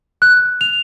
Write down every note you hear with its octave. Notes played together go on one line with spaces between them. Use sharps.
F#6
F7